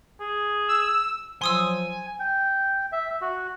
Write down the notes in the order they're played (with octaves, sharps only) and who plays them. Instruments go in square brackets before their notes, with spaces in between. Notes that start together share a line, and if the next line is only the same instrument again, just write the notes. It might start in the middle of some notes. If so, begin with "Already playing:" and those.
[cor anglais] G#4
[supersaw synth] E6
[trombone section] F3 C5 [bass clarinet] F#3 [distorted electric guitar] G#5 [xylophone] C6 D#6 E6
[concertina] G5
E5
F#4